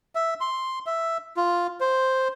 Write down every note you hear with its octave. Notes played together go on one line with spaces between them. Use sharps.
E5
C6
E5
F4
C5